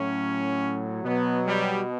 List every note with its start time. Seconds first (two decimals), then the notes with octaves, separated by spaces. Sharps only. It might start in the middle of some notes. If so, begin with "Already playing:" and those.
Already playing: A2 F#3 C#4
1.03 B2 F#3 B3
1.45 G3